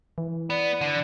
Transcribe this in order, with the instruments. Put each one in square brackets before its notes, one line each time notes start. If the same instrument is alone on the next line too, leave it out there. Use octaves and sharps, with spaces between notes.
[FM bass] E3
[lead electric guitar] B3 [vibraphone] D5
[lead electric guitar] D3